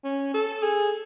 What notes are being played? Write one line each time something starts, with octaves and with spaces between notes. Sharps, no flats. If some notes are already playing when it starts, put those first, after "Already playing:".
C#4
A4
G#4